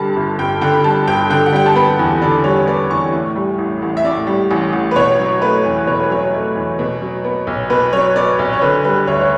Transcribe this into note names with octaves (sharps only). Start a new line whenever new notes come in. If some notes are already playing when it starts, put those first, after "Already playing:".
Already playing: G2 D3 G3 A5
G1
G2 G5
D3 G5
B5
G3 A5
G1 G5
D3 G5
F#5
G3 G5
A5
B3 B5
E2
D3 D5
G3 C#5
B3 D5
E2 C#6
A2
G3
A1
A1
E5
A2 D5
G3
A1
A1
B4
B2 C#5
F#3
A3 B4
E2
B2 C#5
B4
F#3 C#5
A3
E2
B2
F#3
B3
B1
B2 B4
F#3 C#5
B3 D5
B1
C#5
D3 B4
G3 B4
D2 C#5
C#5